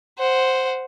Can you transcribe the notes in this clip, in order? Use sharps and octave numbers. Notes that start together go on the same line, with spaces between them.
C5 F#5